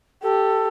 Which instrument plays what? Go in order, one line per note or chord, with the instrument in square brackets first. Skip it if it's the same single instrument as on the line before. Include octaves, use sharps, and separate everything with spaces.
[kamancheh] G4 [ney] A4